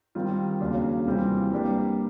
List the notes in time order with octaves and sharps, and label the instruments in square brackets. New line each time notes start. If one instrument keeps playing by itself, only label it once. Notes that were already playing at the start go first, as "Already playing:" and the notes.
[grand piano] D#3 G3 C4 F4
D#2 C#3 F#3 A#3 D4
C3 E3 G3 C4 F4
G3 A#3 D4 G4 B4